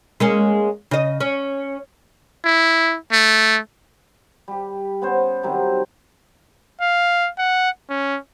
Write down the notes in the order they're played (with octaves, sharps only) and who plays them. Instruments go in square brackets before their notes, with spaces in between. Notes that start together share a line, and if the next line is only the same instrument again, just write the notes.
[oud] G#3 A#3 C#4
C#3 D#5
C#4
[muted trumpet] E4
A3
[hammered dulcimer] G3 G4
B3 C#4 C5
C3 D#3 F#3 G3
[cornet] F5
F#5
C#4